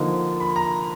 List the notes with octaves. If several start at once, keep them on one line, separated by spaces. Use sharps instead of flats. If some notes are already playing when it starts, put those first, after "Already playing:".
Already playing: D3 F3 A#3 D#4
B5
A#5